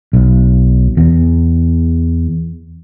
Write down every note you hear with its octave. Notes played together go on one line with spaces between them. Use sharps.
B1
E2